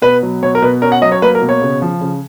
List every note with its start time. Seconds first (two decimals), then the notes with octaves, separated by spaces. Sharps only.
0.02 B2 B4
0.23 F#3
0.42 B2 C#5
0.55 A#4
0.62 B2 B4
0.82 C#4 A#4
0.92 F#5
1.02 F#3 D#5
1.12 C#5
1.22 A#3 B4
1.35 A#4
1.41 B2
1.49 C#5
1.62 C#3
1.82 F3
2.01 C#3